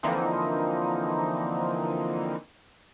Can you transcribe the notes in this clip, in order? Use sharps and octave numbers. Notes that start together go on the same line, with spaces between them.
D3 E3 F3 A#3 C4 D#4